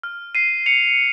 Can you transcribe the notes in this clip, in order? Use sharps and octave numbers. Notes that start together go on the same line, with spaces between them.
F6
C7 D#7
C#7 F7